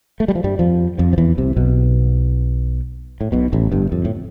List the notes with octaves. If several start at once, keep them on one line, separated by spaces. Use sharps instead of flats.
A3
G3
F3
G2 G3
F2 F3
F2 F3
F3
E2 E3
C2 C3
B1 B2
A2
B1 B2
A1 A2
G1 G2
F2
A2